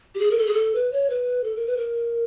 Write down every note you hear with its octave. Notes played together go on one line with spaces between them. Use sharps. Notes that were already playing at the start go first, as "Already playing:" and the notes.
G4
G#4
A#4
A4
G#4
A4
B4
C#5
B4
A4
A#4
B4
A#4